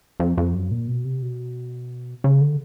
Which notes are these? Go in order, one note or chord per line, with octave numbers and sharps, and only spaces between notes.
F2
F2
F#2
A#2
B2
C3
B2
C#3
D3